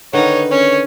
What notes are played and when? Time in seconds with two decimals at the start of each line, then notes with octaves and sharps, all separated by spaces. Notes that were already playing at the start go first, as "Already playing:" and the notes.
0.13 D3 D#3 D#4 B4 C#5
0.51 C#4 C#5